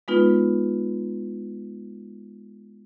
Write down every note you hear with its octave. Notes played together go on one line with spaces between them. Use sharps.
G#3 B3 D#4 F4 B4